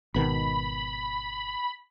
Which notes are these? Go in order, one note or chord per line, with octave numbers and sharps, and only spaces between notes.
G#1 B2 D#3 B5